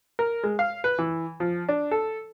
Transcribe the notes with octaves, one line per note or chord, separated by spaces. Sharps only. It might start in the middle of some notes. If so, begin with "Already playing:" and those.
A#4
G#3
F5
B4
E3
F3
D4
A4